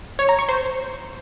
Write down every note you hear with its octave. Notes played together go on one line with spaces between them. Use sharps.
C#5
A#5
C#6
C5